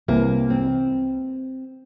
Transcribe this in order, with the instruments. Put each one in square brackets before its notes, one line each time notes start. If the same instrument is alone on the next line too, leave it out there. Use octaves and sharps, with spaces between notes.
[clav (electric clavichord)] C2 C3 E3 [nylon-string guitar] A#3
[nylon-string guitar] C4